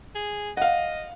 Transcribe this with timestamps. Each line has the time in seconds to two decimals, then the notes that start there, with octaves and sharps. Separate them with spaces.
0.15 G#4
0.57 D#5 F5 F#5